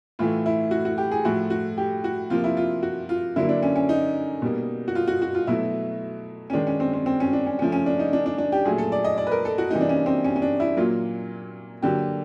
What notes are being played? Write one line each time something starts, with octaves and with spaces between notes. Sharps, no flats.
A2 E3 A3 F4
E4
F#4
F#4
G4
G#4
A2 F3 A3 F#4
F#4
G4
F#4
C3 F3 A#3 F4
E4
F4
F#4
F4
D3 F#3 A#3 E4
D4
C#4
C#4
D#4
B2 G3 A#3
F#4
F4
F#4
F#4
F4
B2 F#3 A3 E4
C#4
D#3 G#3 D4
C#4
C4
C4
C4
C#4
D4
C#4
C#3 F3 A3 C#4
C#4
D4
D#4
D4
D4
D4
G4
A#2 F#3 A3 G#4
A4
D5
D#5
D5
B4
A#4
A4
F#4
C3 E3 G3 A#3 D#4
D4
C#4
C4
C#4
C#4
D4
E4
A#2 F#3 A#3 F4
D3 F#3 A#3 G4